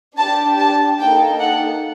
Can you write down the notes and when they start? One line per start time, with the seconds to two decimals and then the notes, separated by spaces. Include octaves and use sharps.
0.17 D4 G4 A5
0.58 A5
1.00 A#3 D#4 A4 G5
1.41 F#5